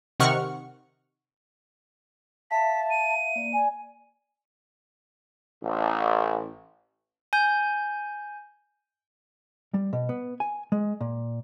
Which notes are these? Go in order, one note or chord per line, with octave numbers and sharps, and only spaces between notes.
C3 D#3 F#5 C#6 F6
E5 F5 A5 B6
D#7
A#3 D5
D5 G#5
A1
G#5 G6
G3
B2
B3
G#5
G#3
A#2